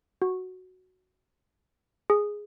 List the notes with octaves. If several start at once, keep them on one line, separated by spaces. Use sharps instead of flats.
F#4
G#4